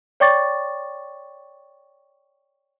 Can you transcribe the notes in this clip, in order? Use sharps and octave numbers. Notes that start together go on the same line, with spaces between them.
C#5 D5 G5 C#6 D6 A6